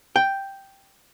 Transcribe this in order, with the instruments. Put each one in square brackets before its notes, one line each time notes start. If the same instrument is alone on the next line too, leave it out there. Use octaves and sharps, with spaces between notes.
[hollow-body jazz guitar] G5